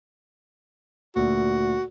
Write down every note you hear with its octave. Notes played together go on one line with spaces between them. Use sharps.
D2 A#2 F#4